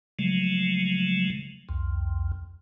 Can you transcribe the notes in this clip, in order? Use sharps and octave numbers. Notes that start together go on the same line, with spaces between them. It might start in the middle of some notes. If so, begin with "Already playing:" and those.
C#3 F3 F#3 G#3 A3
C2 F2